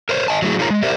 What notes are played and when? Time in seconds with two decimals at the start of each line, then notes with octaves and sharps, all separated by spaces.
0.09 A#4 C5 C#5
0.28 D#5 G#5 A5
0.42 F#3 A3 E4 G#4
0.59 D#4 F4 G#4 A#4 C#5 A#5
0.70 G#3
0.83 G4 A#4 C5 D5 E5